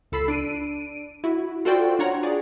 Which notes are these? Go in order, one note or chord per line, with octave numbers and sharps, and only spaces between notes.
C#2 A4 B5 E6 C7
D4 D7 D#7
E4 F#4
F4 F#4 A4 C5 D5 G5
D4 F4 C#5 F#5 A#5
G#4 D5